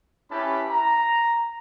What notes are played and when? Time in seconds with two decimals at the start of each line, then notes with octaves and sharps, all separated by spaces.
0.31 C#4 E4 G4 B4 A5 B5
0.71 A#5